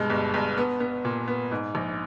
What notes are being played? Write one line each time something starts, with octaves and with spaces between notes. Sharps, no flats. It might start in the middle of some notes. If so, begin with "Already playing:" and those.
Already playing: G2 B2 G#3
G1
G1
B3
B3
A#2
B3
G#2
A#1